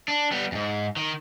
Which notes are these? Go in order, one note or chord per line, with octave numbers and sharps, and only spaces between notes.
D4
G3 B3
F2 G#2
D#3